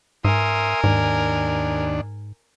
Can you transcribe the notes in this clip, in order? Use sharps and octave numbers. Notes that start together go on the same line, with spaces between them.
G#2 A#4 E5 G#5 C6 D#6
D#2 G#2 D4